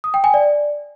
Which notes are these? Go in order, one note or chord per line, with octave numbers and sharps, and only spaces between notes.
D#6
G5
G#5
D5